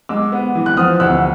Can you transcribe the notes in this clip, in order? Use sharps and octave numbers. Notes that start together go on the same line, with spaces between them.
G#3 D6 E6
B3
E3
F#6
F3 D#6 F6
D2 E6 F#6